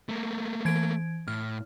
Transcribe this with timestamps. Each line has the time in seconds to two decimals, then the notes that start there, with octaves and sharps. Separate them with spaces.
0.09 A3 A#3
0.65 E3 G#6 D7
1.28 A2 F6